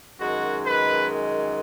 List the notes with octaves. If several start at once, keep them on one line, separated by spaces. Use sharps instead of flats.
F#2 D#3 G#3 F#4
B4